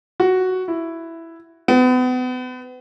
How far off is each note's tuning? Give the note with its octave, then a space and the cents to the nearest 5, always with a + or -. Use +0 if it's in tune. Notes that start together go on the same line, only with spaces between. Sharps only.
F#4 +5
E4 +5
B3 +35